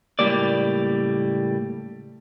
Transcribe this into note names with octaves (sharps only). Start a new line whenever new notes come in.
C#2 A2 G3 A#3 D5